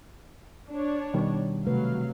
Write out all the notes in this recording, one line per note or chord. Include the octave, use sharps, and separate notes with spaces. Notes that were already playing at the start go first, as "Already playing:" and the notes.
D4 C#5
B2 D#3 G3
C3 F#3 A3 B4 F5